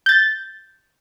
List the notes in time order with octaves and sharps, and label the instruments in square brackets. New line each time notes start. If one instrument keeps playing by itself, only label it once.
[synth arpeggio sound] G6 A6